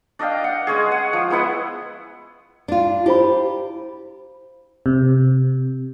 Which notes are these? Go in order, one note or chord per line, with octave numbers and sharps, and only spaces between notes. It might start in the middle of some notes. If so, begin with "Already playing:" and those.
D4 D#5 F5 G5
F#5
G#3 C#4 G#4
F#5
F3
G#3 B3 E4 F#5
D4 F4
E4 G4 C5 B5
C3